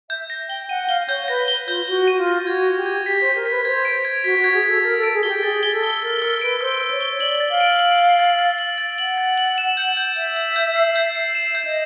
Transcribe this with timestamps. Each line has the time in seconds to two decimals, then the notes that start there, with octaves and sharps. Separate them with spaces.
0.10 E5 G6
0.30 A#6
0.49 G5 G7
0.69 F#5 D#7
0.89 F5 G7
1.09 C#5 G6
1.28 B4 A#6
1.48 G7
1.68 F4 G6
1.87 F#4 G7
2.08 D#7
2.17 F4
2.27 A#6
2.47 F#4 G#6
2.67 G#6
2.77 G4
2.86 G#6
3.06 G4 B6
3.21 C5 B6
3.35 A#4
3.46 B4 B6
3.65 C5 G#6
3.85 D7
4.05 G#6
4.24 F#4 B6
4.39 F#4 G#6
4.54 G#4
4.64 A4 G#6
4.83 A#4 A6
4.98 A4
5.03 D7
5.13 G#4
5.23 F#4 G7
5.28 G4
5.43 G#4 A6
5.63 G7
5.72 A4
5.83 E6
6.02 A#4 A6
6.22 A#4 E6
6.41 B4 D7
6.61 C5 E6
6.81 E6
6.91 C#5
7.01 G7
7.20 D5 F#7
7.40 A6
7.50 F5
7.60 D7
7.79 F#7
7.99 A6
8.19 A6
8.39 A6
8.58 F#7
8.78 A6
8.98 F#5 F#7
9.18 A6
9.38 F#7
9.58 E7
9.77 G6
9.97 G6
10.16 E5 G6
10.36 G6
10.56 G6
10.76 C7
10.96 G6
11.16 C7
11.35 E5 E7
11.55 G6
11.65 D#5